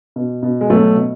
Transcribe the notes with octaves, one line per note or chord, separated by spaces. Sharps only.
B2
B2
G#3
B2 F#3 A3
B2